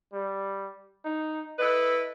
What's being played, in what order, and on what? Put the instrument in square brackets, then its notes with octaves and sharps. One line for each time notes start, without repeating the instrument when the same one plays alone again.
[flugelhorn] G3
D#4
[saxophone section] E4 A4 B4 [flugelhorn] D#5